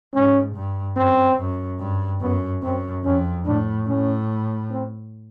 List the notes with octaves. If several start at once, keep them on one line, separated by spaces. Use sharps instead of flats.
G#2 C#4
G2
F#2 C4
F#2
G2
F#2 B3
F#2 C4
F2 C#4
A2 D4
A2 C#4
C4